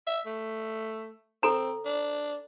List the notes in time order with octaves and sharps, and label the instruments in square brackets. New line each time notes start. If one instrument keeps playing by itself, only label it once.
[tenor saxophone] E5
A3
[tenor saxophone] C4 [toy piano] A4 A#5
[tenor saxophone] D4